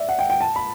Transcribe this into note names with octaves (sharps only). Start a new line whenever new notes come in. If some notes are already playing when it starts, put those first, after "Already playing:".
Already playing: D5 E5
F#5
G5
G5
A5
B5